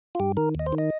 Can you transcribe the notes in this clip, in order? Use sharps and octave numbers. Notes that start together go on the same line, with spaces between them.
F4
G2 G4
D#3 A#4
D#2 D#5
C5
D#3
D#5